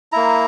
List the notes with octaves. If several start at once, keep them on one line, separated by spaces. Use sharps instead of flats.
A#3 E4 A#5